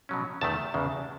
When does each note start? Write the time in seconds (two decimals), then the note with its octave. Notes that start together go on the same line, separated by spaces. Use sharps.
0.09 B2 F#3 C#4
0.41 E2 D#3 A3 A5
0.74 E2 C#3 G#3